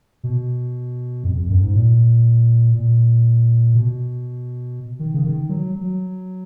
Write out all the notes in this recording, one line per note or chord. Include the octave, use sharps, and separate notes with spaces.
B2
F2
F2
F#2
G#2
A#2
A#2
B2
D#3
C#3
D#3
F#3
F#3